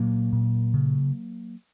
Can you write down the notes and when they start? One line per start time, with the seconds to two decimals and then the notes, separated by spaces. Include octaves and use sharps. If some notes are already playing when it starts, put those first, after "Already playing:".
Already playing: A#2 F#3 A#3
0.33 A#2
0.74 C#3